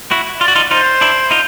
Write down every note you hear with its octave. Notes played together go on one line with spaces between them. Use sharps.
E4 F#4
F4 D5
F#4
D#4 F4
D#4 F4 C5
D4 E4
D#4 F4